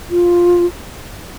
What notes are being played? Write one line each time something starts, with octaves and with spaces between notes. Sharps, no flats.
F4